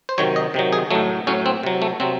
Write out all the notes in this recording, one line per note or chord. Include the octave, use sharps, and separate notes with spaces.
C5
C3 D#3 F#3 C#5
D#5
C3 D#3 F#3
G#4
A2 F#3 A3
A2 F#3 C#4
C4
C3 F#3
A3
C3 F#3 C4